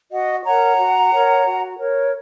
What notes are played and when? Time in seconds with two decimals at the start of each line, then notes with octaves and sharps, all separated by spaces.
0.11 F#4 D#5 F#5
0.45 A#4 C#5 F#5 A#5
0.78 F#4
1.12 A#4 C#5
1.45 F#4
1.79 A#4 C#5